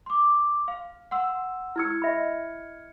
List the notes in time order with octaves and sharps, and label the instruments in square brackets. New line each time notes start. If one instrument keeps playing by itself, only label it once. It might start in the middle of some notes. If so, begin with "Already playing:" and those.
[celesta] C6 D6
F5
F#5 C6 E6
[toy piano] E4 E6 [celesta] F6 G#6 C#7
[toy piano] D#5 E5 B5